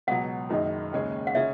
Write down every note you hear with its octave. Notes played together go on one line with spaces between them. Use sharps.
C#2 B2 F#3 F#5
F#1 F#2 D#3 G#3 D#4
D#2 C#3 G#3 C#4
F#5
C#3 G#3 C#4 E5